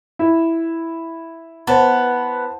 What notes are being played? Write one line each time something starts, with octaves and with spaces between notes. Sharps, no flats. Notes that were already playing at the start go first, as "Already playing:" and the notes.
E4
B3 C5 A5